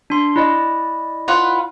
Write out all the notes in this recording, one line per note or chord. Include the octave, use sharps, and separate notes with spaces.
D4 C6
E4 D5 D#5
F4 B4 F#5